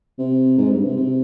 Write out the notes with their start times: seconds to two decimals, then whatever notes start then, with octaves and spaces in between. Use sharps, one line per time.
0.19 C3
0.58 G#2
0.70 G2
0.84 C3
0.96 C3